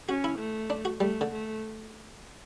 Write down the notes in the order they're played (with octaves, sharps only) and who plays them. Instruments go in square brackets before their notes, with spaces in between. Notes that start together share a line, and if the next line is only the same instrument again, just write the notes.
[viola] C#4 [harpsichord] F#4
[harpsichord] E4
[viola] A3
[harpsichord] D4
F#4
[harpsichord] G3 [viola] A3
[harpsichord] D3
[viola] A3